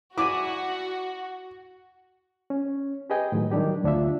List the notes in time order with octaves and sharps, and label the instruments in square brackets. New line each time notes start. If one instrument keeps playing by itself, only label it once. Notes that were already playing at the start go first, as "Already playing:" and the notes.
[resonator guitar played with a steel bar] E4 D5 G#5 [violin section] F#4 [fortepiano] D6
[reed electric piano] C#4
G4 G#4 B4 D#5 G5 G#5
A2 D#3 F#3
D#3 F#3 G3 D4 G4
D2 D4 F4 E5